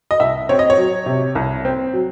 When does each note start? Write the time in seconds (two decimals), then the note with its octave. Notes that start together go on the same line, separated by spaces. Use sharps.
0.11 D#5
0.20 C2 E5
0.49 C4 C#5
0.59 D#5
0.70 C#5
0.78 F#3
1.06 C3
1.35 C2
1.65 C4
1.93 F#3